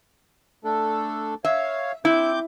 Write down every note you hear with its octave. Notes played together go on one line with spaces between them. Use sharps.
A3 D4 A4
C#5 E5 F5
C4 E4 D6 G6